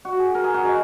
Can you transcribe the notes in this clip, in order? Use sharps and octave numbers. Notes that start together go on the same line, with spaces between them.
F#4
G#4
A#4
G#4
F#4
D#4